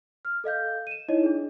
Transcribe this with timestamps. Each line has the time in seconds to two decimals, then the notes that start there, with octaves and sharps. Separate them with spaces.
0.25 F6
0.44 A4 D#5 F5 G6
0.87 D#7 E7
1.09 D#4 E4 C#5 D#5
1.23 D4 G#4